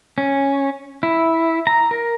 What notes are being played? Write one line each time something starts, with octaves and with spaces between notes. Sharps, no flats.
C#4
E4
A#5
A#4